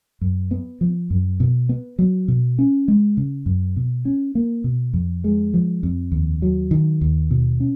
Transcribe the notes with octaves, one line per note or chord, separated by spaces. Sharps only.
F#2
B3
F3
F#2
B2
B3
F#3
B2
C#4
G#3
C#3
F#2
B2
C#4
A#3
B2
F2
G#3
F3
F2
D#2
F#3
D#3
D#2
B2
C#4